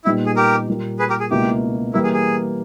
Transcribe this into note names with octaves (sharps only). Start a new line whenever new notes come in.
A#2 G3 B3 D#4 E4
G#4
G4 A#4
A#2 G3 A#3
G#4 B4
G4 A#4
G#4
C#2 B2 A#3 E4 G4
E3 G3 A#3 E4
G#4
G#4